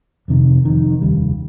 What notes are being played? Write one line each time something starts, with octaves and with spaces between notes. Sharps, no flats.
F1 F2 C3 D#3
F1 F2 D#3
F1 D#2 C#3 G3